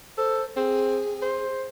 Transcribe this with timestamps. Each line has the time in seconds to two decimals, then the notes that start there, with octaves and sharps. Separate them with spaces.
0.18 A4 C5
0.56 C4 G#4
1.22 C5